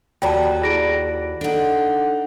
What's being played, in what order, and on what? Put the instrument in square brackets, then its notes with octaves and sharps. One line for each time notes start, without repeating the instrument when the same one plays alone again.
[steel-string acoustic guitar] D#2 F#4 A4 [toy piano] F4 D5 A#5 [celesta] G5 A5
[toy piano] E4 G#4 B5 [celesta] D5 A#6 D7
[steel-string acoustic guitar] D4 D#4 [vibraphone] A4 F#5